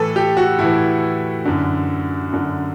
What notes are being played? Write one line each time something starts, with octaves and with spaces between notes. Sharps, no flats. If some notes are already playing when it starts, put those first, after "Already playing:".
Already playing: A2 E3 A4 B4
G4
F#4
A2 E3 E4
F#2 D3
F#2 D3